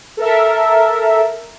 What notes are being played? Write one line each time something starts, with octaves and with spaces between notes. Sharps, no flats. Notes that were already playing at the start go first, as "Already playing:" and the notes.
A4 A#4 E5